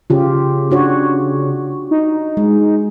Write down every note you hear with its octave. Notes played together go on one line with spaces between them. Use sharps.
C#3 F4 G4
D4 F#4 C#5
D#4
G#3